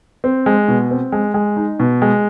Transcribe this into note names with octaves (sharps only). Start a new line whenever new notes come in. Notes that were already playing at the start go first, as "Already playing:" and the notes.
C4
G#3
B2
C4
G#3
G#3
D#4
B2
G#3